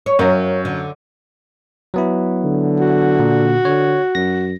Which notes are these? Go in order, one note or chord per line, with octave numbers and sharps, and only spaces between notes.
C#5
F#2 C#4 F4 A#4
D3
F#3 B3 E4
D3
F#4
A#2
D3 C#5
F#2 A#6